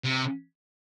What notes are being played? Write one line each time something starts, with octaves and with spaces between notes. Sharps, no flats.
C3